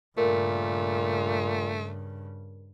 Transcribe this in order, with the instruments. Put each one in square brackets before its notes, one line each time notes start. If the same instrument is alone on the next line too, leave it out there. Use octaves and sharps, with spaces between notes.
[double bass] G2 C#3 [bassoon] A#2 [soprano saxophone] A3 [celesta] A#4